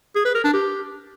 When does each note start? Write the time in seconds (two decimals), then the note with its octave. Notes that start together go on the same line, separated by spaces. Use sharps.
0.15 G#4
0.25 B4
0.35 A#4
0.44 D4
0.54 G4